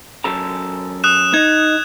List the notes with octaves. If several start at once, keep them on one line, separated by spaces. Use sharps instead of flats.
F#2 A4 A#5
D#6 F#6 E7
D#4 G#6